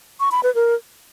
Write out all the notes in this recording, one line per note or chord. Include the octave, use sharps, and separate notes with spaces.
C#6
B5
B4
A#4